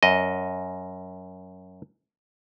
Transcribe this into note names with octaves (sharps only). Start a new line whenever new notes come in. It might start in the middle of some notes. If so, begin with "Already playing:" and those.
F#2 D#5